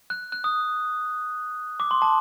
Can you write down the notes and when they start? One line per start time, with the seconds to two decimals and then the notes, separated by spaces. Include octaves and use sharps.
0.10 F#6
0.32 F#6
0.44 D#6
1.80 D6
1.91 C6
2.02 A5